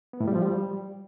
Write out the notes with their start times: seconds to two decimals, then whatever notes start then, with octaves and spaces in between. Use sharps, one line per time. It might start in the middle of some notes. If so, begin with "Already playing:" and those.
0.13 B3
0.20 A2
0.28 G3
0.35 F3
0.42 G3